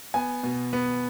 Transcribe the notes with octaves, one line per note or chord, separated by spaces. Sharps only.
B3 G#5
B2
B3